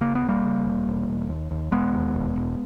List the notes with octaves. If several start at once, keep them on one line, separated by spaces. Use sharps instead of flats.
C#3 A#3
B3
E1
G3 A#3
C#3
E1
E1
E1
D#2
D#2
E1 G#3 B3
D#2
E1
E1